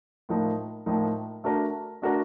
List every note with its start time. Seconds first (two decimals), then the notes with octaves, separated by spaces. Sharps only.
0.29 A2 F3 A#3 D#4
0.86 A2 F3 A#3 D#4
1.44 A3 D4 F#4 A#4 D5
2.02 A3 D4 F#4 A#4 D5